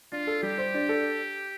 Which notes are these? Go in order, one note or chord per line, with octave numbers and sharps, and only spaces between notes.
D4 F4
A4
G3 G4
C5
D4
A4